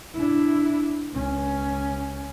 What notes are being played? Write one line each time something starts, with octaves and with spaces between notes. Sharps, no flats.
D4 E4
C#2 C#4